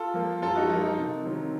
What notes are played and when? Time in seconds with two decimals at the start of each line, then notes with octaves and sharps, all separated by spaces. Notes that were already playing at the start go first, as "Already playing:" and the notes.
Already playing: F4 A4
0.14 F3 A#3
0.42 F#2 F4 A4
0.55 D#4 F#4
0.70 F3 D#4
0.72 A#3
0.83 D#4
0.98 C3
1.25 D#3 F#3 C4